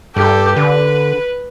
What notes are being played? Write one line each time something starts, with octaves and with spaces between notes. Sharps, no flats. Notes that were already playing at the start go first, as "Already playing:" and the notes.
G2 G4 A4
D3 B4